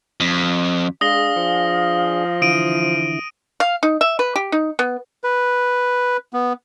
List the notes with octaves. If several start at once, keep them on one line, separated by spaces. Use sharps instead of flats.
F2
G#3 D4 G#4 F5 D#6 A#6 G7
F3
D3 E3 E4 D#6 D7 D#7
F5
D#4
E5
B4
G4
D#4
B3
B4
B3